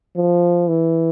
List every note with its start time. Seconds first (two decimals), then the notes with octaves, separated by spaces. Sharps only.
0.16 F3
0.68 E3